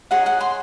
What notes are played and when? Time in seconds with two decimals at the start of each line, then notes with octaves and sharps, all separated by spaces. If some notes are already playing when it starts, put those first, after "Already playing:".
0.11 D#4 G#4 C#5 F#5
0.26 F#5
0.41 C6